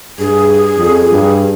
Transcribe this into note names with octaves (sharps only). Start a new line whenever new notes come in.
G2 G#4
F2
G2